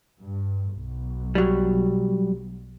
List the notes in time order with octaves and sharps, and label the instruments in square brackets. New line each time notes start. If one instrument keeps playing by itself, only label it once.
[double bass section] G2
B1
[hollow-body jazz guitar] F#3 G3